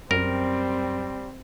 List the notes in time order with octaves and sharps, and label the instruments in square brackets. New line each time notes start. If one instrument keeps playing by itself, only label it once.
[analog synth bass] F#2 [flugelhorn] G3 [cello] C4 [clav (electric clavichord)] A#4